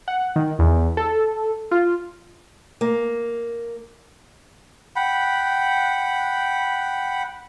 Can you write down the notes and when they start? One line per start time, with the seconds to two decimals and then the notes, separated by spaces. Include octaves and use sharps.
0.08 F#5
0.36 D#3
0.59 E2
0.97 A4
1.71 F4
2.81 A#3
4.96 F#5 G5 B5